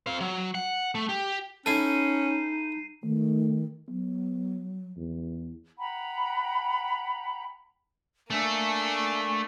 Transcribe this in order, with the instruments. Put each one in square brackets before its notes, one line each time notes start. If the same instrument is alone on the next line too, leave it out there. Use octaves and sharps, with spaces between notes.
[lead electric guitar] C4 F5
F#3
F#5
A3
G4
[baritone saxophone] C#4 [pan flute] D#4 [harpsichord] E4 A4 [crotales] C7 D#7
[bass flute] D#3 [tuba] A3
[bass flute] F#3 [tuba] B3
[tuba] E2
[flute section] F#5 G5 A#5 B5
[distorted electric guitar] A3 A4 [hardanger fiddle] A#3 D4 [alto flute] G#5